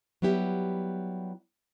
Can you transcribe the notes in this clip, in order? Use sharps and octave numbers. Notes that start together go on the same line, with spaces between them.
F#3 G3 B3 E4 G4